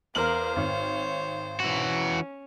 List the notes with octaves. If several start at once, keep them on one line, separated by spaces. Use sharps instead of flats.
E2 A#4 C5 F5 F6 F#7
G#1 C#5
E3 C#4 F#4